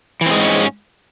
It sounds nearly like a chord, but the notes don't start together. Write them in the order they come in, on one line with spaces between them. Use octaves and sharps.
E3 C4 G#3 G#2 C#4